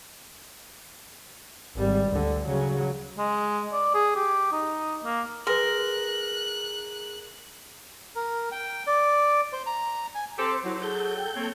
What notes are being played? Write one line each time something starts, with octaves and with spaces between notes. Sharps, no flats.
G#1 G3
D2 D3
C#3 F#3
G#3
D5
G#4
G4
D#4
A#3
G#4 A#4 B4 C6 F#6
A#4
G5
D5
C5
A#5
G#5
C4 G4 A4 C5 C6
F#3 E4
G#4 A4 G6
G5
A#3 C4 C#5